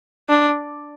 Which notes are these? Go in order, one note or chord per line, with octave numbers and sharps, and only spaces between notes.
D4